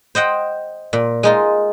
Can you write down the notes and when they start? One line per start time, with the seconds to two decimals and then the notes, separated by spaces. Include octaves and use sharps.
0.15 C5 D#5 F#5 G5
0.93 A#2
1.23 G#3 D#4 F4